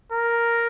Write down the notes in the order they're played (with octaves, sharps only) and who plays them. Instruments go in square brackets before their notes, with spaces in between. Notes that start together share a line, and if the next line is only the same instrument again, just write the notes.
[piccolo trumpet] A#4